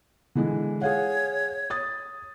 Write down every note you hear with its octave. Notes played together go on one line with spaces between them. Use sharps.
D3 E3 G#3
G#4 C#5 F5 F#5
D#6 A6